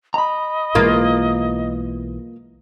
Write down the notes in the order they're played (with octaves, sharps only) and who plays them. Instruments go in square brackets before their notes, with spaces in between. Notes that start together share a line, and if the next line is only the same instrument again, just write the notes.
[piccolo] D#5 [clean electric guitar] A#5 B5
[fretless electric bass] B1 E3 G#3 [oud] A#3 F4